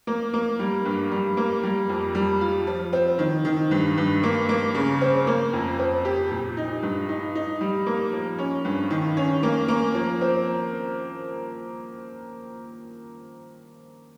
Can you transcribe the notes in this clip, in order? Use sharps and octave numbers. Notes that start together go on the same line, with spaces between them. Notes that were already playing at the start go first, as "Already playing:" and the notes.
A#3
A#3
G3
G2
G3
A#3
G3
F2
G3
F4
F3
C4
D#3
D#3
G2
G2
A#3
A#3
C#3
C4
A#3
F2
C4
G4
A#2
D#4
G2
D#4
D#4
G3
A#3
F3
C#4
G2
D#3
C#4
A#3
A#3
F3
C4